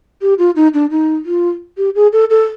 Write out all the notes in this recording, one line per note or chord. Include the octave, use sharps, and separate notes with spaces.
G4
F4
D#4
D4
D#4
F4
G4
G#4
A4
A4